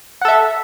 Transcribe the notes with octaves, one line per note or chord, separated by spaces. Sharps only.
A4 E5 F#5